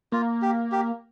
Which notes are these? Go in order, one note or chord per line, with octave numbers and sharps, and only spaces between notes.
A#3 F4
G4
G4